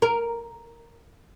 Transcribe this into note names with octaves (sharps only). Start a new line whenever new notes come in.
A#4